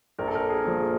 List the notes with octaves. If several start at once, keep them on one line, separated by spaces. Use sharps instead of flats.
A#1 A#4
A4
A#4
G#4
A#2 F3